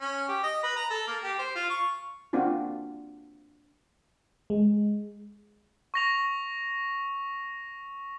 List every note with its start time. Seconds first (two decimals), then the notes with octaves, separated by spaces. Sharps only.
0.01 C#4
0.28 G4
0.43 D#5
0.63 B4
0.76 A#5
0.90 A4
1.07 A#3
1.23 G4
1.39 C5
1.55 F4
1.70 C#6
2.33 A#3 C4 D4 F4 F#4
4.50 G#3
5.94 C#6 A#6 F7